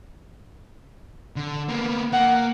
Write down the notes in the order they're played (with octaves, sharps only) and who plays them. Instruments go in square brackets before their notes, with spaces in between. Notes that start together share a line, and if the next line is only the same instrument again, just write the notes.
[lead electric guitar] D3
A#3 B3
[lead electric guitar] A#3 [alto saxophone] F#5